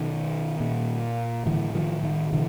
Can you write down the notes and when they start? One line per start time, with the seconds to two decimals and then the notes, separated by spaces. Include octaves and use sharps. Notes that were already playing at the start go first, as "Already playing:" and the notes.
Already playing: B2 D#3
0.60 A#2
1.46 A2 D3 E3
1.75 D#3 F3
2.03 D#3
2.33 B2 D3 E3